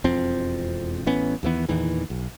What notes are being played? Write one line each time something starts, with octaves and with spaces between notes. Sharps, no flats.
E1 F2 F3 C4
A1 E3 B3 C#4
D#2 E3 B3
E2 A#2 D#3 E3
B1